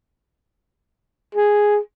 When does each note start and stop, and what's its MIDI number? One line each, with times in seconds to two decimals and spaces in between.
1.35 1.77 68